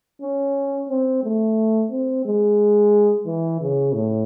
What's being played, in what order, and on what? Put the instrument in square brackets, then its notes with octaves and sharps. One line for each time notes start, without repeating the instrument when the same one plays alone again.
[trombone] C#4
C4
A3
C4
G#3
E3
C#3
A2